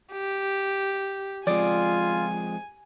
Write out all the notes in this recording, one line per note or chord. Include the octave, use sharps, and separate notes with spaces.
G4
F3 G#3 C4 F4 D5 G#5